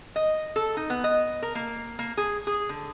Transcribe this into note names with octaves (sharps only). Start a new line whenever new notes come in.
D#5
A4
D#4
B3
D#5
A#4
A#3
A#3
G#4
G#4
D3